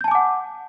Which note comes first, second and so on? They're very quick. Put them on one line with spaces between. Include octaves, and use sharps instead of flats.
G6 A5 G#5 D6 F#5